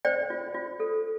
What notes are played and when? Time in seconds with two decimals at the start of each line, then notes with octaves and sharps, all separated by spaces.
0.05 C5 D5 G5
0.30 F4
0.54 F4
0.80 A4